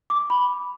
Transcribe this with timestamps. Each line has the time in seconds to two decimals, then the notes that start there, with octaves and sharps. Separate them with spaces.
0.10 D6
0.30 B5